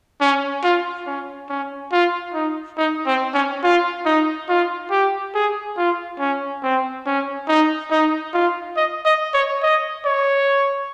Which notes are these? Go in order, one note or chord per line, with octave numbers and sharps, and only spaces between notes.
C#4
F4
C#4
C#4
F4
D#4
D#4
C4
C#4
F4
D#4
F4
G4
G#4
F4
C#4
C4
C#4
D#4
D#4
F4
D#5
D#5
C#5
D#5
C#5